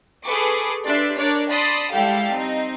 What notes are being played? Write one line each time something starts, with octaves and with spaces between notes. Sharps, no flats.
G#4 A4 B4 C#6 D6
D4 G4 B4 D5 E5 C6
D4 A#4 C#5 D5
D5 A5 B5 C6 D#6
G3 G#3 E4 G4 A4 F5
C4 D#4